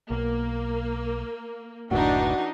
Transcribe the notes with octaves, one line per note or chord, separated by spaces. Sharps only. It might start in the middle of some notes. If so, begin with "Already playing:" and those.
B1 A#3
F#1 D2 A2 E3 D4 D#4 F#4